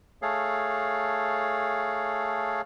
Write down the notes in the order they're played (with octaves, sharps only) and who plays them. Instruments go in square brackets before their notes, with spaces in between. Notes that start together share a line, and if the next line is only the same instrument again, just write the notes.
[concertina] A3 G#4 A4 C#5 F5